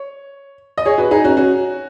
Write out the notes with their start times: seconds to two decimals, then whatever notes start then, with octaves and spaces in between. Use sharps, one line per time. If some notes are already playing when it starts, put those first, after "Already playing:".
Already playing: C#5
0.78 D#5
0.85 G#4 C#5
0.98 F#4 B4
1.11 D#4 G#4
1.24 C#4 F#4
1.37 C#4 F#4